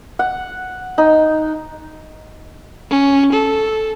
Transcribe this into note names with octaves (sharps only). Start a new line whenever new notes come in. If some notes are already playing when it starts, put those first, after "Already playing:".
F#5
D#4
C#4
A4